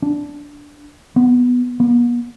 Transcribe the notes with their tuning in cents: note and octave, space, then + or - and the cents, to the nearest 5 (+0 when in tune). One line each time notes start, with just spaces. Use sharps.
D4 -10
B3 +0
B3 -45